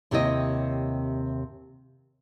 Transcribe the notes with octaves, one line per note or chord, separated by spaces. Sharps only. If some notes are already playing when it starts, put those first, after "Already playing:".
D#2 C3 C4 E4 C#5 D#5